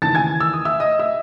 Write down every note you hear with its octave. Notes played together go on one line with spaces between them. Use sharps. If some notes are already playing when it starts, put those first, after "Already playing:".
D#2 C#3 E3 A5 A6
G#5 G#6
E6
D#6
E5 E6
D#5 D#6
E5 E6